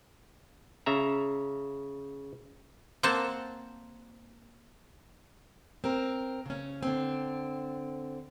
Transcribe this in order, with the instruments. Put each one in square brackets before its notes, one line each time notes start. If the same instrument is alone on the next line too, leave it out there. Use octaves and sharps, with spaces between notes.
[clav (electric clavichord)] C#3 E5 A#5
[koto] A#3 C4 C5 F#5 A5
[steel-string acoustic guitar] C4 A#4
C#3 C#4
D3 C4